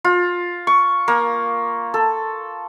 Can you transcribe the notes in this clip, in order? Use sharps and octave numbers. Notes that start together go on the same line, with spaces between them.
F4
C#6
A#3
A4